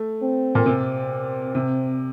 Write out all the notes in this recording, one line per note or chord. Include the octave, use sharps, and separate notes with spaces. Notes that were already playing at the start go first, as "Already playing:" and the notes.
Already playing: A3
C4
A#2
C3 C4
C3